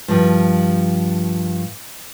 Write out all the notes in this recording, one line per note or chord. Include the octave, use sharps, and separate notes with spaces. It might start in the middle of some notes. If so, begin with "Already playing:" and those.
G2 F3